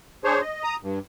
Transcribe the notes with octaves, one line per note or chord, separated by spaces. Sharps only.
D4 G#4 C5 C#5
D#5
A#5 D#6
G2